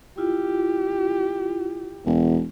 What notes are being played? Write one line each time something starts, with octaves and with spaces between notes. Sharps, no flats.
E4 F4 G4
E1 E2